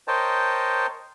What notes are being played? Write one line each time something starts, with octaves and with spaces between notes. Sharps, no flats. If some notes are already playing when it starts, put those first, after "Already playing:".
A#4 C5 C#5 D#5 G5 A5